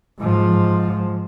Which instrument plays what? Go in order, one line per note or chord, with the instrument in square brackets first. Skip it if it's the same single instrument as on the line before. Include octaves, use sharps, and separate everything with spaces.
[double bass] G#2 F3